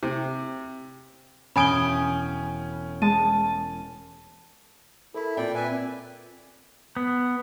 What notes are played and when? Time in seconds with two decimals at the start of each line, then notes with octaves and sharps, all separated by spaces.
0.03 C3
1.56 E1 C#4 G5 G#5 B5 D#6 D7 G7
3.02 G#3 A5 D#7
5.14 E4 A4 A#4 B5
5.37 A#2 C4 D5 G5
5.55 B4 D5 E5 G#5
6.97 B3